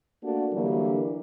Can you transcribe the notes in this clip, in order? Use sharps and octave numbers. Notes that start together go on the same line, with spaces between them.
A3 A#3 D4 F#4
D3 E3 F#3 G3 A#3 D4